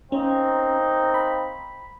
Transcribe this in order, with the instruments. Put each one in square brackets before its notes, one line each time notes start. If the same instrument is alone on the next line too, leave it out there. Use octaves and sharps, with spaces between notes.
[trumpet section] A#3 C4 D#4 [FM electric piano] C#4
[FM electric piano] B5